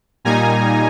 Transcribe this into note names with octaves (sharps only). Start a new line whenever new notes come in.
A#2 G3 A#3 D#4 G#5 A#5